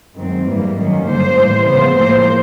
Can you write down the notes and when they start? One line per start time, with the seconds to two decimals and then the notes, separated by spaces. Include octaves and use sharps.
0.16 F#2 D#3 G#3 C4
0.46 G#2 E3 G3 A#3
0.77 F#2 D#3 G3 A#3 C#4
1.06 G2 D3 G3 A#3 C5
1.36 A2 E3 G3
1.66 C#3 F3 G#3 B3 C5
1.96 A2 F3 A#3 C5